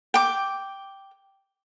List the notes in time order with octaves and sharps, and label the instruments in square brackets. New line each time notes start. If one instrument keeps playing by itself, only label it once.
[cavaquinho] G5 D6